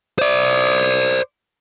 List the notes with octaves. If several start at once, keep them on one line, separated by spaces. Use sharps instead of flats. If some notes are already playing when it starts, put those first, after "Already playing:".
C5 D5